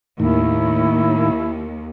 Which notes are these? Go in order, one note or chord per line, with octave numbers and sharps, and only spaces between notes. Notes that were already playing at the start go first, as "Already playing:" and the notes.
D#2 A2 D#3 E4